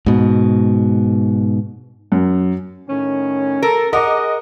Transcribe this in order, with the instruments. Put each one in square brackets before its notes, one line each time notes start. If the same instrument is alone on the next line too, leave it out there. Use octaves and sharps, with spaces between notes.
[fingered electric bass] G#2 B2
[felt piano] F#2
[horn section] A2 D#3 C#4
[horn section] A4 [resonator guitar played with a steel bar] A#4
[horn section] G#4 F#5 [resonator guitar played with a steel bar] A#4 [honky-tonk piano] D#5 D6